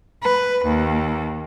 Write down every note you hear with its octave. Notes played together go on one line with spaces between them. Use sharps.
B4
D#2